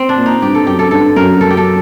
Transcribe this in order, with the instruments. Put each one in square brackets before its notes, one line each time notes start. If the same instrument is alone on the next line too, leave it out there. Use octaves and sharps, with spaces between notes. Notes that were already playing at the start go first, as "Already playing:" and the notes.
Already playing: [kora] C4
D4
[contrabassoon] A#2
[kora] D#4
[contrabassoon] G2 [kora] G4
[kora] A4
[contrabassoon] F#2 [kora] G4
[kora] A4
[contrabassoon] G2 [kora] A4
[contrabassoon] F#2 [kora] A#4
[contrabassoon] F#2 [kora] A4
[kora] G4
A4